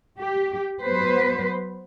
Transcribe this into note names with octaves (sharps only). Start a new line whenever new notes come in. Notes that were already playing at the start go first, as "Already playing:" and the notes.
G4
F#3 B3 B4 C5